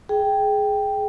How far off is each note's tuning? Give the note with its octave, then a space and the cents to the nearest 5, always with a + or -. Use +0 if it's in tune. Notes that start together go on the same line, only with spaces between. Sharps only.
G#4 +15 G5 +0